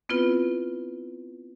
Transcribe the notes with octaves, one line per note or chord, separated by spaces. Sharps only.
B3 C4 E4 F4 B4